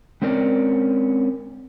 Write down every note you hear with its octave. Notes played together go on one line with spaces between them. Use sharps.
G#3 C4 C#4 A#4 D5